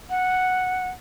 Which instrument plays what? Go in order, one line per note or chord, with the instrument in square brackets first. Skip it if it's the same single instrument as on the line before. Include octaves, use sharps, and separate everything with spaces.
[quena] F#5